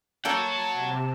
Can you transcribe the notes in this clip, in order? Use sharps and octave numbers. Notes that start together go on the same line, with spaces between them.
A#3 A4 C#5 F#5 G5 A5
C3